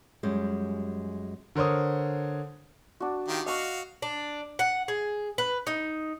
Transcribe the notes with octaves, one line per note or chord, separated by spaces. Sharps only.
F#2 G3 G#3
D3 A#4 C5 C#5 D#6
D4 F#4
D#3 F4 G4
F#4 D#5 F5 C#6
D4
F#5
G#4
B4
D#4